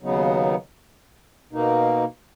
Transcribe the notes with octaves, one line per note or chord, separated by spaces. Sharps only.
D#2 C#3 F#3 B3 D#4
B2 A#3 D#4